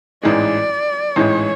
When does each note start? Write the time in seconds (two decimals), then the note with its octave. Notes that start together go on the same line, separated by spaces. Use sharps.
0.23 A1 G#2 E3 G#3 D5
1.16 A1 G#2 E3 G#3 C#5